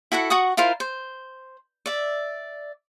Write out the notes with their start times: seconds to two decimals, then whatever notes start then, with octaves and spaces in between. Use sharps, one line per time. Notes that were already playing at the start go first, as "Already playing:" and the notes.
0.12 E4 F#4 A4 F#5
0.30 F#4 F#5 C#6 D#6
0.57 E4 F4 A#4 C5
0.80 C5
1.86 D5 E5